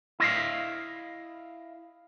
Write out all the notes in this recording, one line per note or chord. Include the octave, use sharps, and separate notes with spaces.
E4 D#5 F5